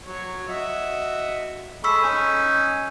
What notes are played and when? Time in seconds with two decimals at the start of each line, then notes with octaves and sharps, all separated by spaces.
0.06 F#3 C#5
0.48 F#4 D#5 E5
1.84 G#3 A4 B5 C#6 E6 B6
2.03 C#4 D#4 G#5